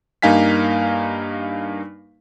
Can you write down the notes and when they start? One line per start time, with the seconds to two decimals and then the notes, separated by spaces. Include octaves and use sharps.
0.22 G2 A#3 D#4 F5 G#5 B6